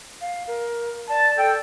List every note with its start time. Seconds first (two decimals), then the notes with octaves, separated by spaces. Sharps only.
0.21 F5
0.48 A#4
1.10 D5 A5
1.38 A4 G5